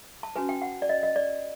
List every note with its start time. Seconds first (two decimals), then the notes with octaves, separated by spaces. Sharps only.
0.23 A5
0.36 C#4 F#4 B4 G#5
0.49 G5
0.62 F#5
0.82 D5
0.89 D#5
1.03 D#5
1.16 D5